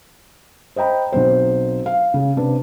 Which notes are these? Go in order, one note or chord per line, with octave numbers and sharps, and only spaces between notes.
C5 D#5 G5 A#5 B5
B1 F#3 C4 C5
F5
C#3
C3 D4 B4